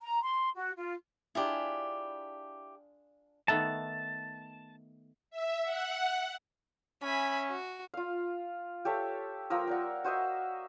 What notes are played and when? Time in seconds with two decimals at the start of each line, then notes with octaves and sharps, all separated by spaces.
0.02 A#5
0.23 C6
0.55 F#4
0.76 F4
1.35 D4 E4 F4 G4 G#4
3.48 D#3 A3 B3 A5
5.30 E5
5.63 F#5
7.02 C#4 E5 G#5 B5
7.49 F#4
7.94 F4 F5
8.85 G4 A4 C#5 E5
9.50 F3 A#3 A#4 E6
9.67 A#4 D5 F#5
10.04 F#4 C5 D#5 E5